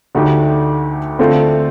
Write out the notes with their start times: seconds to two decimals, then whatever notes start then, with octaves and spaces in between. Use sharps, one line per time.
0.15 D2 D3 A3 D#4 G4
1.19 D3 A3 C4 F4 A4